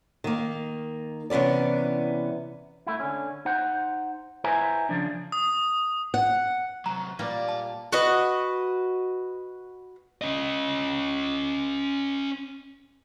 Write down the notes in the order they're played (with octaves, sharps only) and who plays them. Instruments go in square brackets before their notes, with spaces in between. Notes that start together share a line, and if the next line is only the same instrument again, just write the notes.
[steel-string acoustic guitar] D#3 A#3
C3 E3 B3 C#4 D5
[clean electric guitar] A3 E4
D3 C#4
D#4 C5 F#5
E4 B4 C5 E5 G#5 A#5
C#3 F3 D4
[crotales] D#6
[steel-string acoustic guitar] F#5
[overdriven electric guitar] C3 F#3 [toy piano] A#5
[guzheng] A#2 G3 A#3 [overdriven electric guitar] B4 D5
[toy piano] A5
[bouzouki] F#4 B4 D#5
[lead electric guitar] C#4 D#5